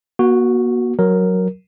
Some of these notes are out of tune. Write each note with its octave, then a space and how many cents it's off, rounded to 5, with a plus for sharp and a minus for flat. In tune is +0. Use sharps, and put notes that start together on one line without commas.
A#3 +45 F#4 +0
F#3 +0 A#4 +0